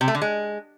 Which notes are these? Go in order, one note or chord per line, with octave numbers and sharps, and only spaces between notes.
C3
A3
D3
G#3